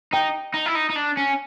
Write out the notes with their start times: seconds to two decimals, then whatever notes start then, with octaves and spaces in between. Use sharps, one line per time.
0.13 D#4 G5
0.54 D#4
0.66 E4
0.75 D#4
0.90 D#4
0.95 D4
1.17 C#4